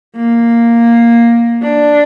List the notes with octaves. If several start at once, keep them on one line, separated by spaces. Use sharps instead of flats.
A#3
D4